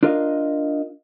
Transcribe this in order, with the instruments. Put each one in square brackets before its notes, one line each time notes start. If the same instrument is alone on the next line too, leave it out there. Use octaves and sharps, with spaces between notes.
[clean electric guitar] D4 F4 A#4 D#5 F5